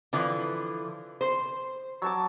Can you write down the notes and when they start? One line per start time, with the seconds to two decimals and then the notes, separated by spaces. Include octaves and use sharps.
0.13 D3 E3 F3
1.21 C5
2.02 F#3 A5 D6